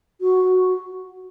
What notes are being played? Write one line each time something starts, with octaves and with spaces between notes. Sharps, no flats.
F#4